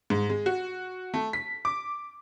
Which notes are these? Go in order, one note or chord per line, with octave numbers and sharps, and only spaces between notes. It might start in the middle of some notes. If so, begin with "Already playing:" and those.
G#2
G#3
F#4
A3
B6
D6